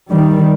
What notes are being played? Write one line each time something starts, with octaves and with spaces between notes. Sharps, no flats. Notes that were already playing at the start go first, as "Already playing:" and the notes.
D#3 G3